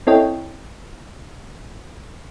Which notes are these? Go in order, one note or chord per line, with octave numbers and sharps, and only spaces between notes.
C4 E4 A4 C#5 D#5 G5